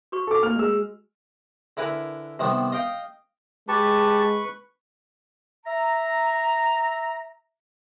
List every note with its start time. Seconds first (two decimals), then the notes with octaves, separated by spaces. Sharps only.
0.12 F#4 B4 C#6
0.27 A4 D6
0.42 A#3 F6 F7
0.56 G#3 E6
1.77 D3 E4 A#4 B4 G#5
2.39 C3 D#3 G3 B3
2.72 D#5 F5 G5
3.68 G#3 G4 B4 A5 C#6
5.67 E5 A#5